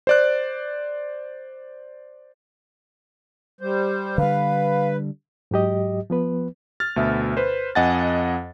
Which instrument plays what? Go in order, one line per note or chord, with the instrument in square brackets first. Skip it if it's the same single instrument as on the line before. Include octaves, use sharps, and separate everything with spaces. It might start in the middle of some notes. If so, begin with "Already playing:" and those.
[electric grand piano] C5 D5 F#6
[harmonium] G3 C5
[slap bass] D3 G3 [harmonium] B4 [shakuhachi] F5
[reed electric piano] G#2 F#3 G4 D#5
F3 B3 B4
[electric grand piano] F6 A6
D2 B2 E5
B4 C5
F2 D#5 F#5 G#5 A6